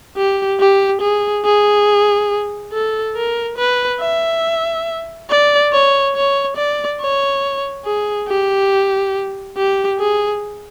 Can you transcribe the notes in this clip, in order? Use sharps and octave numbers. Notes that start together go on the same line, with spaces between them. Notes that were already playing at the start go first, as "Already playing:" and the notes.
G4
G4
G#4
G#4
A4
A#4
B4
E5
D5
C#5
C#5
D5
C#5
G#4
G4
G4
G#4